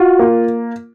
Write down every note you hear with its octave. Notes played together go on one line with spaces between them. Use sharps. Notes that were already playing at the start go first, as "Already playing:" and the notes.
Already playing: F4 F#4
A#3